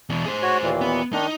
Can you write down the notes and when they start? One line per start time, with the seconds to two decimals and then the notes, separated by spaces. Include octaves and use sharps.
0.10 E2 B2
0.26 G#4 C5
0.43 F#4 C#5
0.62 D#2 A#2 E3
0.81 B3
1.13 D#3 D4 D#4